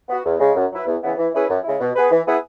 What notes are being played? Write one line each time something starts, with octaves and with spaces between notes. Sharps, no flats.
B3 F#4
E2
C#3 G#3
F#2
F#3 E4 B4
E2
C#3 E3 B3 E4
E3
C#4 E4 G#4 B4
F#2
C#3 G#3 E4
B2
B3 G#4 B4
E3
B3 E4 G#4 B4